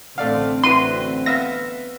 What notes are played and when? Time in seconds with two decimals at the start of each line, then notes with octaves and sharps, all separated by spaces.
0.18 A1 D3 A3 C4 D5 F5
0.64 E4 F#4 B4 C6 D#7
1.26 B3 E5 F5 A#6